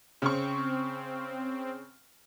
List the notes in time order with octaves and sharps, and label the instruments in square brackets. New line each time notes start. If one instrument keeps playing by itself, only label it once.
[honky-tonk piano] C#3 C#6 [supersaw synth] C4